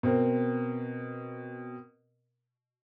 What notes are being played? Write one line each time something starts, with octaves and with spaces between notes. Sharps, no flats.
B2 C4 A#4